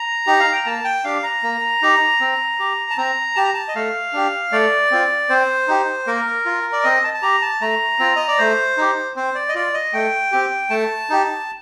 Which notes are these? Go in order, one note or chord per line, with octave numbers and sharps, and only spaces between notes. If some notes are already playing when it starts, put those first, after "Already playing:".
Already playing: A#5
D#4 G4
F5
G5
A#3 A5
G5
D4 G4 F5
A#5
A#3
D#4 G4
C4
G4
A5
C4 A#5
G4 A5
A#5
A5
D#5
A3 F5
D4 G4
A3 D5
C4 F4
C4 C5
D#4 G4
A#3 A#4
F4
D5
C4 D#5
A5
A5
G4 A#5
A5
A3 A#5
C4 F4
D#5
D5
A3 C5
D#4 G4
C4 C5
D5
D#5
F4 D5
D#5
A3 G5
C4 G4
A3 A5
D#4 G4